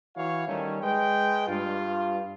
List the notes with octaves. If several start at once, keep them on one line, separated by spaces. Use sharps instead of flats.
E3 F#4 C#5 F5
D#3 G3 A3 C#4
G#3 B4 G5
G2 F4